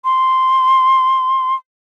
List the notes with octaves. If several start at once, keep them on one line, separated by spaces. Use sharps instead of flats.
C6